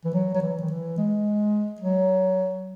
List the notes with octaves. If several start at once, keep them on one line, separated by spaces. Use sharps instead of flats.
E3
F#3
F#3
E3
D#3
E3
G#3
F#3